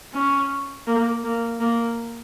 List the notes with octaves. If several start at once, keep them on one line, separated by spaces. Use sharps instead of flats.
C#4
A#3
A#3
A#3